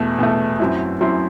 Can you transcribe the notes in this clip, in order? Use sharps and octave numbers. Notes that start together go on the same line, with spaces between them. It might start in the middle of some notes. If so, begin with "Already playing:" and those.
Already playing: E2 B2 A3
E2 B2 A3
F#2 F#3 C4 E4
F#2 F#3 C4 E4 C6